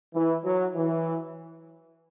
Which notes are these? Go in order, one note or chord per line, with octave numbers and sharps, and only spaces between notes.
E3
F#3
E3